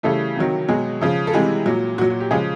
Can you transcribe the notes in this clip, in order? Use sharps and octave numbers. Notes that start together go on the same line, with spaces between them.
C#3 E3 G3 A3 A4
C3 D#3 F#3
B2 F#3 G#3 G#4
C#3 F3
A4
C3 E3 G3 G#3 G#4
A#2 F#3
A#2 F#3 F#4
F#4
G4
C#3 F3 G#3 G#4